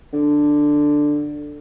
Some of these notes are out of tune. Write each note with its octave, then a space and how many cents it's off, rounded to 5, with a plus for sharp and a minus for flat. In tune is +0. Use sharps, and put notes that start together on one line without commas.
D3 +5